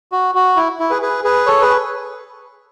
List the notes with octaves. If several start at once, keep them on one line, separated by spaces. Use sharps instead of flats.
F#4
F#4
E4
E4
G#4 B4
G#4 B4
G#4 B4
A4 C#5
G#4 B4